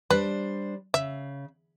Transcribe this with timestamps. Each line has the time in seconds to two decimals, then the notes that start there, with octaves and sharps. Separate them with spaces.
0.10 G3 D4 B4 C5
0.94 C#3 E5